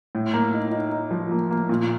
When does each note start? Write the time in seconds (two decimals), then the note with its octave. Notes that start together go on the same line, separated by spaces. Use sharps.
0.15 A2
0.34 A#3
0.54 D#4
0.72 D#4
0.92 D#4
1.11 F3
1.31 A#3
1.51 A#3
1.69 A#2